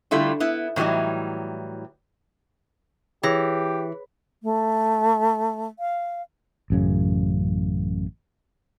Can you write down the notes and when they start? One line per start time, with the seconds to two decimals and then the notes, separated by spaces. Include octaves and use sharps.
0.11 D3 G3 A3 E4 F4
0.40 B3 E4
0.76 A2 E3 F#3 G3 D#4
3.23 E3 G4 G#4 C#5 A#6
4.43 A3
5.79 F5
6.70 A1 F#2 C#3